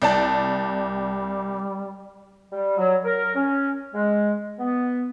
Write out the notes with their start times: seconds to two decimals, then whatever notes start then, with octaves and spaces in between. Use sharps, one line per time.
0.02 C2 G3 D5 A5
2.52 G3
2.78 F#3
3.05 A#4
3.35 C#4
3.94 G#3
4.59 B3